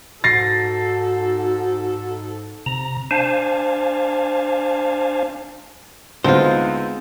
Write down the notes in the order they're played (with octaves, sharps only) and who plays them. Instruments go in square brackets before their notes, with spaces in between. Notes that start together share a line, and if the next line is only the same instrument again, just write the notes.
[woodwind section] G#2 [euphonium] F#4 [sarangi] A4 [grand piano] A6 A#6 C7
[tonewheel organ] C3 A#5
D4 C5 F5 G#5 A5
[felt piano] D2 [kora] G#3 F4 [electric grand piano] B3 C4 D#4 [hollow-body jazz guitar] C5